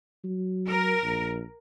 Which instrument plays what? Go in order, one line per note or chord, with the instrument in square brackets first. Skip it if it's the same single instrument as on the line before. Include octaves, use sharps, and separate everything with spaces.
[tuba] F#3
[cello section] A#4
[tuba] A#1